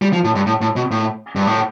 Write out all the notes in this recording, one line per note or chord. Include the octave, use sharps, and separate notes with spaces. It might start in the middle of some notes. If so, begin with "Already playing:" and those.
G3
F3
A2
G2
A2
A2
B2
A2
G2
A2